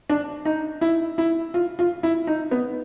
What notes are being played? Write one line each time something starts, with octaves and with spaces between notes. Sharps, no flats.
D4
D#4
E4
E4
F4
F4
E4
D#4
B3